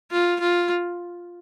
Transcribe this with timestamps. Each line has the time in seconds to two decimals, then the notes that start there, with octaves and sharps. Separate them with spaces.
0.11 F4
0.40 F4